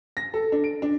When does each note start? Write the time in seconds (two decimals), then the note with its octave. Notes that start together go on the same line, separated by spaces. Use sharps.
0.17 A#6
0.34 A4
0.52 D4
0.64 D7
0.82 D4